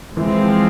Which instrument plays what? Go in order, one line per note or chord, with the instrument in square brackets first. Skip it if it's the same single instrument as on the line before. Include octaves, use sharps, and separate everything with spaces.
[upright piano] E3 [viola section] F3 G#3 C4